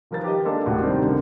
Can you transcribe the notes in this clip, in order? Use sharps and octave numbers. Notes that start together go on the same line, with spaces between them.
D#3 F3 A#4 B4 A6
G4 D#5
G#3 A#3 D4 A4
D#1 A2 F#4
C3 D#3 G3 C4 D4
F#1 D2 D3